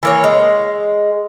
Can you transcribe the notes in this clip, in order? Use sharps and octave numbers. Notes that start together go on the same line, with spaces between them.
E3 A#3 C#5
G#3